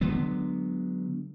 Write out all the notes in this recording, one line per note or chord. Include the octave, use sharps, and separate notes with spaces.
D3 F#3 G#3 B3